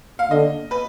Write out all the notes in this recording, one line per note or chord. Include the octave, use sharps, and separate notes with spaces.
F5
D3 D#5
B4